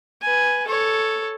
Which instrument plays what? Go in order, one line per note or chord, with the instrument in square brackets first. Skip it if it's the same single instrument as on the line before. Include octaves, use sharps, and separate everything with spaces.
[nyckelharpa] B4 G#5
A4 C#5